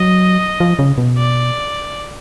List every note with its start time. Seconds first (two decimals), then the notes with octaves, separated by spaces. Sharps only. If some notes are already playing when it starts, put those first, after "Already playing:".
Already playing: F#3 D#5
0.60 F3
0.79 C#3
0.98 B2
1.18 D5